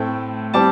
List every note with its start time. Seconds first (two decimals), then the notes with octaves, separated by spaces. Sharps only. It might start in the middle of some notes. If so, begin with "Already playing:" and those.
Already playing: A2 A3 C4 G5
0.54 G3 C4 A5 D6